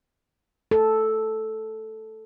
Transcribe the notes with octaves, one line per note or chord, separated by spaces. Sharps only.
A4